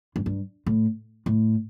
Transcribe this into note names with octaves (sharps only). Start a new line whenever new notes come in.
G2
G2
A2
A2